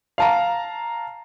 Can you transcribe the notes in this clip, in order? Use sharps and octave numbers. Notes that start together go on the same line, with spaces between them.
F5 A5 A#5